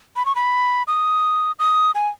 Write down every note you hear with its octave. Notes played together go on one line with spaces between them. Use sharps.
B5
C#6
B5
D#6
D#6
G#5